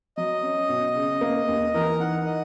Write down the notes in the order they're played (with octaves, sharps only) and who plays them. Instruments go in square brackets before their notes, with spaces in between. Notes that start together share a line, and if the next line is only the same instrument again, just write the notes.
[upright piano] F#3 [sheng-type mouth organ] D#5
[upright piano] C#4
B2
C#3
A#3
D#2
[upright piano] E3 [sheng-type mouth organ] A#4
[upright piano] D#4 [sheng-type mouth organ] F#5
[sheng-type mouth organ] D#5